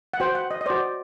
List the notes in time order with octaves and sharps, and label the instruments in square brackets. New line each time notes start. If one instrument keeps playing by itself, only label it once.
[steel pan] F#5
F#4 C5 G5
F#5
D#5
D#5
F#4 C5 D5